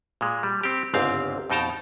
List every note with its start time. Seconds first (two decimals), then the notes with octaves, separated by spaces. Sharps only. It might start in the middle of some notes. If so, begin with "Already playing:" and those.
0.21 A#2 G#3
0.43 G3
0.63 C4 G4
0.94 G1 C#2 G#2 C4 F5
1.50 F2 B2 D#4 G5 A5 A#5